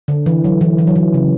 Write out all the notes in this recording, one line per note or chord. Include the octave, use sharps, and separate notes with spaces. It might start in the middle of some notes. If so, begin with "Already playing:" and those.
D3
E3
F#3
E3
E3
F#3
E3
C#3